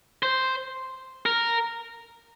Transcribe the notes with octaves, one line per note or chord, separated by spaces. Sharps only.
C5
A#4